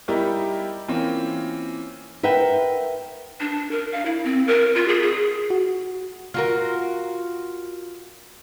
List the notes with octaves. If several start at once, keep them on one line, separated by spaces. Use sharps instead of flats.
G3 D#4 E4 G4 A#4 D5
E3 A#3 C4 C#4 F4
A#4 B4 E5 F#5 G5
D4
A#4
F5
E4
C4
A#4
F4
G#4
G#4
F#4
F4 F#4 A#4